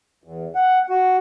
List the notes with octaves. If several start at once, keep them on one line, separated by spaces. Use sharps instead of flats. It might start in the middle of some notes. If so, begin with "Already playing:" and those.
E2
F#5
F#4